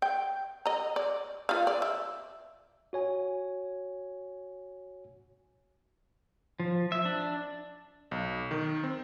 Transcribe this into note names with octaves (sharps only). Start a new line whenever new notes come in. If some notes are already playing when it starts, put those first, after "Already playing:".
G5
D#5 A#5
D5
F4 B4 F5
D5
E5
F#4 C#5 G#5
F3
E5
D4
B1
D#3
C4